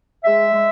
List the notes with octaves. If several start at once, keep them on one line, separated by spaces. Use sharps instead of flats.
G#3 E5
G#3